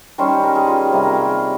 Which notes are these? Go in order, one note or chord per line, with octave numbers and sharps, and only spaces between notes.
D#3 G3 C#4 C5
A#4
G#4
F4
C3 G3 A#3
A#4
A#4
G#4